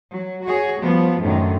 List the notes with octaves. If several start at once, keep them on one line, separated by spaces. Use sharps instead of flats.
F#3
F#4 G#4 C#5
F3 G3 B3
F#2 A2 D3 D#3